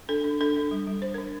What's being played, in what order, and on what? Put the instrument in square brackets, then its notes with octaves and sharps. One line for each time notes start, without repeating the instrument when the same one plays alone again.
[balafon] D4 A4
D4
D4 A4
D4
G3
G3
D4 C5
D4 A#4